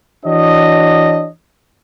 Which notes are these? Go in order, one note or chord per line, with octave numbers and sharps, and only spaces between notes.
E3 D4 F#4 C#5 D#5